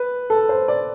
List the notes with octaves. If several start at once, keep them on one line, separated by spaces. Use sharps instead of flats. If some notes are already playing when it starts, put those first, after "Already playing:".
Already playing: B4
A4
C5
D5